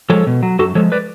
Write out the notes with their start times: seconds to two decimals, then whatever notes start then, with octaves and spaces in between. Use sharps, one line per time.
0.10 F3 G#3 A4 C#5
0.27 B2
0.43 F#3
0.59 F#2 F#4 A4
0.75 F3 G#3 A4 C#5
0.92 B4 D5